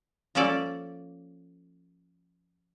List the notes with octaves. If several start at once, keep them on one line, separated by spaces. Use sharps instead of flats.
F3 A#3 C#4 A4 D5